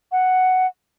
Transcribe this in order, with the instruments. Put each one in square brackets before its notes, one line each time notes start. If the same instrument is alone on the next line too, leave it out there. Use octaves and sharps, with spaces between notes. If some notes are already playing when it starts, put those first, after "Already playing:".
[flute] F#5